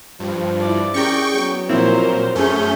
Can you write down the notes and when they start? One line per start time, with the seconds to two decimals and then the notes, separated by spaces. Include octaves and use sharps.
0.20 G2 F3
0.60 E4 D5
0.94 C#4 G4 G#4 A#4 G5 C#6
1.34 F#3 B3
1.69 A#2 F3 C4 E4 A#4 C5
2.35 F#2 A3 C#4 G#4 G6